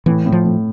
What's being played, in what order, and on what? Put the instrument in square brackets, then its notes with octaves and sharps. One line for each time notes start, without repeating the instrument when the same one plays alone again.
[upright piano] A2 [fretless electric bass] E3
[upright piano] A2
[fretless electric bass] F3
[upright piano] A2